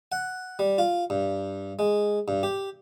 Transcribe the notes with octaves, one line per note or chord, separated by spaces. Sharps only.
F#5
G3
F4
G2
G#3
G2
G4